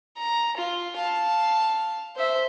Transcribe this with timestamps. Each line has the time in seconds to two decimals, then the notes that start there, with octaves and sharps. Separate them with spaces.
0.18 A#5
0.57 F4
0.97 F5 A5
2.16 C5 E5